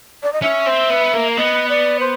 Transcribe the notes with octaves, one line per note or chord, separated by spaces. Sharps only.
D5
D#5
C#4 E5
C4
B3
A#3
B3 D#5
D5
C5